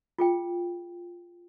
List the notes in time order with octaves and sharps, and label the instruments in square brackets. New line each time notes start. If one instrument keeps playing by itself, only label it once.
[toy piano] F4 G#4 G5